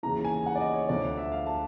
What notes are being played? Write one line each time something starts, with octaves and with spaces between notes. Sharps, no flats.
D#2 C#3 E3 A#5
G#5
F#5
D5
D#5
C#5
D2 D3 F3 D5
E5
F5
A5